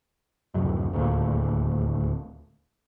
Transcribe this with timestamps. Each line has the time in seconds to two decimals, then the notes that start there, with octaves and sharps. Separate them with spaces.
0.54 D1 C2 F#2
0.92 D#1 D2 A2 A#3